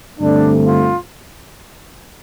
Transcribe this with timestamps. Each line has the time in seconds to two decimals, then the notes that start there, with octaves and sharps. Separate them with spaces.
0.20 G2 D3 A3 C4 D4
0.66 F4